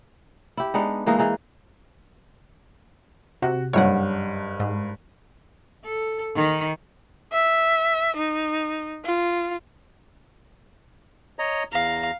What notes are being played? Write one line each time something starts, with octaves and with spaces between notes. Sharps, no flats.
E4 G4
G#3 B3 D4 D#4
E3 G#3 A#3 D#4
E3 D#4 G#4
C3 F#4
F#1 G2 C#5 F#5
G#2
A4
D#3
E5
D#4
F4
C#5 D#5 A#5
E2 F5 A#5